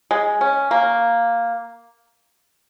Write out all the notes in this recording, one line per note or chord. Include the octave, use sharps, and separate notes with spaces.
G#3
C#4
A#3